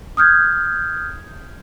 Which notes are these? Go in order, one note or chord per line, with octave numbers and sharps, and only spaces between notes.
D#6 F6 G6 G#6